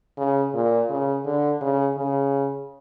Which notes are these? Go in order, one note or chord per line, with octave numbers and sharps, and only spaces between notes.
C#3
A#2
C#3
D3
C#3
C#3